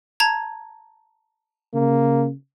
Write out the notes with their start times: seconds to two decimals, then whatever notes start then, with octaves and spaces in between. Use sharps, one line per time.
0.20 A5 A#5 G#6
1.74 C#3 A#3